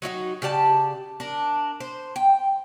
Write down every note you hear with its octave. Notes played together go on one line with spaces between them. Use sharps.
F#3 D#4 E4 F#4
C#3 G4 D5 A5
D4 A#4
C5
G5